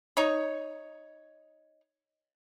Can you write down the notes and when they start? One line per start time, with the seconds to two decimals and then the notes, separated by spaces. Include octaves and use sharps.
0.17 D#4 C#5